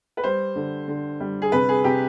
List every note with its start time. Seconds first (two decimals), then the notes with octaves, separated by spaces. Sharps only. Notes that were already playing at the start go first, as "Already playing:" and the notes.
0.17 B4
0.24 G3 C5
0.56 D3
0.88 D3
1.20 G3
1.42 G#4
1.52 C3 B4
1.69 G#4
1.84 C3 G4